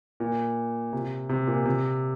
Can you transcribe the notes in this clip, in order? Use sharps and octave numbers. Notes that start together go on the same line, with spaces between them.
A#2
C3
C3
A#2
C3